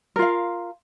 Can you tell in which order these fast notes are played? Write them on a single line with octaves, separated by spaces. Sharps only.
A#4 F4 F5